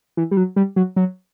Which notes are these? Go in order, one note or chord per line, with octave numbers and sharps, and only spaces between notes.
E3
G3
F#3
G3
F#3
F#3